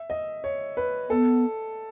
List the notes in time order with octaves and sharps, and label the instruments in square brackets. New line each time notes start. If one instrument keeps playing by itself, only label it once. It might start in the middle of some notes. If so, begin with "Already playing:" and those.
Already playing: [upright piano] E5
D#5
C#5
B4
[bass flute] B3 [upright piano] A4